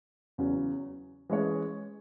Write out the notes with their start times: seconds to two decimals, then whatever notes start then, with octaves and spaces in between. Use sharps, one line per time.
0.38 E2 C#3 F#3 C#4
1.29 E3 G#3 C#4 G#4 C#5